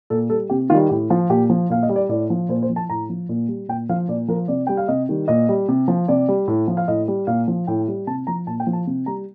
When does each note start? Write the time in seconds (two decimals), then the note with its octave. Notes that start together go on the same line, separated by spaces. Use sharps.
0.10 A#2 A4
0.30 G3 A4
0.50 C3 G4
0.70 D#3 F4
0.75 G3
0.89 A2 G4
1.10 F3 F4
1.30 A#2 G4
1.50 F3
1.70 A#2 F5
1.83 D#5
1.89 G3
1.96 D5
2.09 A2 D5
2.30 F3
2.49 A#2 C5
2.62 C5
2.69 F3
2.76 A5
2.90 A2 A#5
3.09 F3
3.29 A#2
3.48 G3
3.68 A#2 G5
3.89 F3 F5
4.08 A#2 D5
4.28 F3 A#4
4.48 C3 D5
4.67 G3 G5
4.77 F5
4.88 C3 D#5
5.09 D#3 G3
5.28 A#2 D#5
5.49 G3
5.68 C3
5.88 F3
6.08 C3 D5
6.29 G3
6.48 A2
6.68 F3
6.77 F5
6.88 A2 D#5
7.08 G3
7.27 A#2 F5
7.48 F3
7.67 A2 G5
7.88 G3
8.07 C3 A5
8.27 F3 A#5
8.47 A#2 A5
8.60 G5
8.67 F3
8.73 A5
8.87 C3
9.06 G3 A#5